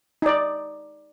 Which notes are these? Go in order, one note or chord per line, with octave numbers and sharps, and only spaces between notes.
D#4 D5